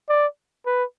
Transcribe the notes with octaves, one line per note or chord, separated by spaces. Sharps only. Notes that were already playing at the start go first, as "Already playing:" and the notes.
D5
B4